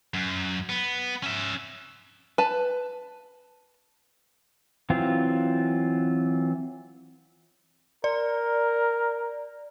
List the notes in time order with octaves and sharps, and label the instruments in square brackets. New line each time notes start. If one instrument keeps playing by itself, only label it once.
[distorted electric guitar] F#2
B3
C#4 E5
[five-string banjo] B4 A5
[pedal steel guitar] E3 F#3 C4 F4
[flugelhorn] A#4 [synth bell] D5